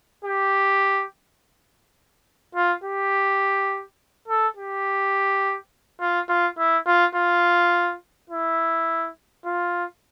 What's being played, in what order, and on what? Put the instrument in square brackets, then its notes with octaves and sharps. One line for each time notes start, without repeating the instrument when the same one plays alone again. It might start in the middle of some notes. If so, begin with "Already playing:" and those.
[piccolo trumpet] G4
F4
G4
A4
G4
F4
F4
E4
F4
F4
E4
F4